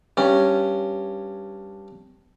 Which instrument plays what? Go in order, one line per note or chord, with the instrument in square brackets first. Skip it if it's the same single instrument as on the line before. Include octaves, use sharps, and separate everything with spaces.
[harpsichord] G2 C#4